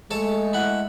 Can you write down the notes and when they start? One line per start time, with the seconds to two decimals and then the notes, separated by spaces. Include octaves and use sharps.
0.11 G#3 A3 A4 C#5 A5
0.53 E4 F#5